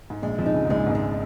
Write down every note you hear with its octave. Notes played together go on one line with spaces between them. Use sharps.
G#2
A#1 A#2 G#3
F2 F3
D#4
C#2 C#3
G#2
A#1 A#2 G#3
G#1 G#2
G#3